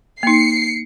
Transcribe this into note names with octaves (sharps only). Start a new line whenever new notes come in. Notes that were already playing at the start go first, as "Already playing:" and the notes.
A#3 D#4 C7 C#7